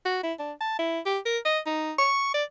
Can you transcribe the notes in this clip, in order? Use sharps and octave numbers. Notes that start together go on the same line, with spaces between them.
F#4
E4
D4
A5
E4
G4
A#4
D#5
D#4
C#6
D5